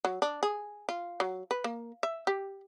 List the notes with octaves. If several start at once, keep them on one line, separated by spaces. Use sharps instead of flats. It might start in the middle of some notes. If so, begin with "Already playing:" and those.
F#3
D4
G#4
F4
F#3
B4
A#3
E5
G4